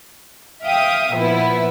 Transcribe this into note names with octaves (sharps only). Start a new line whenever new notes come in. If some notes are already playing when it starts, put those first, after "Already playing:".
E5 F5 G5 D#6
A#2 F3 B3 E4